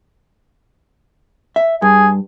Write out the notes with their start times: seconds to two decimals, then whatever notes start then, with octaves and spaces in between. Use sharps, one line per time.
1.56 E5
1.82 G2 G#4